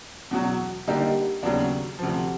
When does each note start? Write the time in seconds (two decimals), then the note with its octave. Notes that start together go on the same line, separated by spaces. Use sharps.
0.31 E2 B2 F#3
0.87 D3 G3 A#3 D#4 G4
1.43 D#2 C#3 F#3 B3 D4
1.99 D2 C3 F3